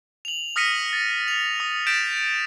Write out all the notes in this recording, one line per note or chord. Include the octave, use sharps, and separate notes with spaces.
F7 F#7
D#6 F6 A#6 B6 C#7 D#7
A6
F7
D#6
G6 A6 B6 D7 E7